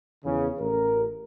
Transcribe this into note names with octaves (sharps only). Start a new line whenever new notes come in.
E2 C#3
A1 A#4